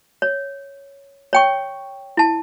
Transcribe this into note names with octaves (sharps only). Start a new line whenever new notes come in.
C#5
C#5 G5 C#6
E4 A5